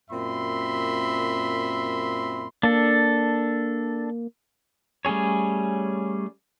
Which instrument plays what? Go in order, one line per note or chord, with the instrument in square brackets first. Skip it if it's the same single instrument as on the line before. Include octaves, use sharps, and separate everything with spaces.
[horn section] F#2 A#2 C4 E5 B5 C6
[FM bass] A#3 [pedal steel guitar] D4 A4
[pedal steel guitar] G3 A3 C#4 G#4 C#5